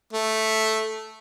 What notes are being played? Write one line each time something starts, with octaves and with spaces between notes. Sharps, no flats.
A3